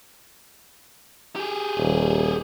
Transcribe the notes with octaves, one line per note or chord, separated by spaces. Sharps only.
G4 G#4
D#1